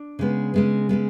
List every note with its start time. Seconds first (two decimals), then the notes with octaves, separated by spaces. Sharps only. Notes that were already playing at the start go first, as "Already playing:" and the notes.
Already playing: D4
0.19 C#3 G#3 B3
0.54 C#3 G#3 B3
0.89 C#3 G#3 B3